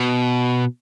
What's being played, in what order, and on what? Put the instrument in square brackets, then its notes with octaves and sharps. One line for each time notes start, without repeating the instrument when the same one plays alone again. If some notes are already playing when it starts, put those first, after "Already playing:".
Already playing: [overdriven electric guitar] B2